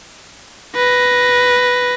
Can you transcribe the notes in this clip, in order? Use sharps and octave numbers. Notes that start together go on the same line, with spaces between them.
B4 A#6